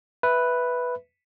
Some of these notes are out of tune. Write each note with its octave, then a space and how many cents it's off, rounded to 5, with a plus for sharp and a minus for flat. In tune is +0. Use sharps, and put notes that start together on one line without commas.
B4 +0 E5 +0